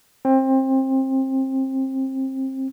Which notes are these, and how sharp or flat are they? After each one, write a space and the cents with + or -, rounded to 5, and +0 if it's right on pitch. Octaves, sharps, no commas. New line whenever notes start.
C4 +25